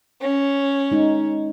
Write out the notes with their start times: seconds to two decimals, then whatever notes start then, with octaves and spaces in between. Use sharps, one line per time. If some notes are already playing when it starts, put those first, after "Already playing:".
0.21 C#4
0.91 G#3 D#4